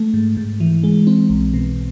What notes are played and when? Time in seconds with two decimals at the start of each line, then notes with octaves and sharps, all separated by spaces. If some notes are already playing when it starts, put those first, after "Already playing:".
Already playing: A3
0.14 G#2
0.37 G#2
0.60 E3
0.84 G#3
1.07 C4
1.30 B1
1.54 B2